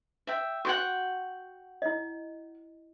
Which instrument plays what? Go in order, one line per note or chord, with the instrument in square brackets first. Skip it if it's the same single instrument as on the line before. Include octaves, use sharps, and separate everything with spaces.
[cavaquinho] E5 G5
[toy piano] F#4 [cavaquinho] F#5 G5 C#6
[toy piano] E4 D#5